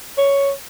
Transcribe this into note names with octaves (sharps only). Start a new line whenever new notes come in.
C#5